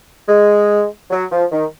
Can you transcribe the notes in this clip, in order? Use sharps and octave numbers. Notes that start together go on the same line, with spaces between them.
G#3
F#3
F3
D#3